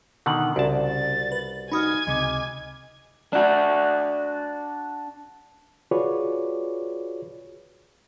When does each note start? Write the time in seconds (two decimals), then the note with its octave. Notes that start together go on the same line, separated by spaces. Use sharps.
0.26 B2 D3 D#3 F#5 F#7
0.56 C2 C#3 F#4 D5 A5
0.88 A6
1.32 B4
1.72 D#4 F#4 D#5 G#5 B5 D#6 F6 G#6
2.07 C#2 C3 D#5 D6
3.33 D4 F#4
5.91 F4 F#4 G#4 B4 C#5 D5